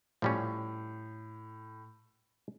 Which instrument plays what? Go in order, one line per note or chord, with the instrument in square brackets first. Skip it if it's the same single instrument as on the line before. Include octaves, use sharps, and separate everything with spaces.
[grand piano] A2 [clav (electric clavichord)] F3 G3 C#4